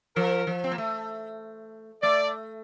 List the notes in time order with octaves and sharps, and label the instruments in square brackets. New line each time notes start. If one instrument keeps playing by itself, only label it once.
[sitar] F3 [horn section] A#4
[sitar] F3
C4
A#3
A3
[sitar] A3 [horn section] D5